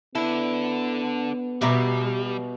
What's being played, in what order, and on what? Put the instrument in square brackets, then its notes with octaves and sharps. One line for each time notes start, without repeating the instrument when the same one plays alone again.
[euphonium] B3 [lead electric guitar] D4 A4 [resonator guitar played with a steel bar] E4
[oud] B2 [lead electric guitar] G3 [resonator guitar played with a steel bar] G4 E5 A#5